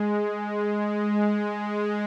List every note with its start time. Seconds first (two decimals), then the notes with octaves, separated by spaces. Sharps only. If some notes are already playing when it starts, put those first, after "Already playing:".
Already playing: G#3